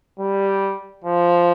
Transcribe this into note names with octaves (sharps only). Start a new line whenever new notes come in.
G3
F3